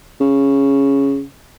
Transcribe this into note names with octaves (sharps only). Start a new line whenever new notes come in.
C#3